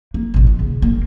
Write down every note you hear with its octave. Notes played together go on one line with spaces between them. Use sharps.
A#3
A1 B2
B3
C#3
A#3